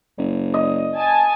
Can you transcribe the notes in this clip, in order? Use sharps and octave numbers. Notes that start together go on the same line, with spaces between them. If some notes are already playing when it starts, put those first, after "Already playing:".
F#1
D#5
G#5 A5